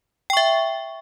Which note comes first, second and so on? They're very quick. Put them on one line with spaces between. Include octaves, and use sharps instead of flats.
G5 C#6 E5